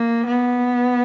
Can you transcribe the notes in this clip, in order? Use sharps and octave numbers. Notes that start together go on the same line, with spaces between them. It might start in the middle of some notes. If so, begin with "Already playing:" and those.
Already playing: A#3
B3